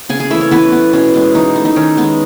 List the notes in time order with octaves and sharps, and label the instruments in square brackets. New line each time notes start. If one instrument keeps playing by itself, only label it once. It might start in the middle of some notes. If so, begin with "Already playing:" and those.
[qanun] C#3 G#4 G#5
G#4 G#5
E3 A3 E4 E5
C#4 C#5
E3 B3 B4
B3
B2 C#4
G#3 B3
E3 D#4
A3
D#4
D#3 C#4
G#3 B3